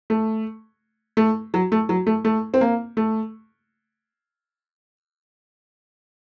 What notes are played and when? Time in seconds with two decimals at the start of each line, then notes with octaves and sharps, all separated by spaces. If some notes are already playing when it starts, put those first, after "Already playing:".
0.10 A3
1.17 A3
1.54 F#3
1.72 A3
1.89 F#3
2.07 A3
2.25 A3
2.54 C4
2.61 A#3
2.97 A3